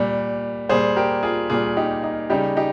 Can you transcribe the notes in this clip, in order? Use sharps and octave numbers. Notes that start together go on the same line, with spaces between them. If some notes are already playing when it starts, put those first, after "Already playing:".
Already playing: A#2 G3
A#2 G3 G#4 C5
G4 A#4
F4 G#4
A#2 G3 F4 G#4
D#4 G4
D#4
C#3 G3 D#4 G4
D#4 G4